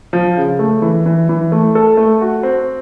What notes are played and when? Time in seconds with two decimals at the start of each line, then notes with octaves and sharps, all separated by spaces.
0.13 F3
0.37 C#3
0.59 A3
0.82 E3
1.06 E3
1.29 E3
1.52 A3
1.75 A4
1.97 A3
2.21 F#4
2.43 C4